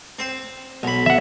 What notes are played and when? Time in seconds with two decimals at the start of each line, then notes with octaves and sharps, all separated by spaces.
0.19 C4 C5
0.83 B1 B5
1.06 E5 F#5